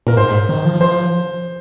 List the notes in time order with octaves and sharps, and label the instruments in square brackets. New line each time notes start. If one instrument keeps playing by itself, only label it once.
[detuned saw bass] A#2 [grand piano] A#4
[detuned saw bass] G#2 [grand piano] C5
[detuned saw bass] D#3
F3
[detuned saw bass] F3 [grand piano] C5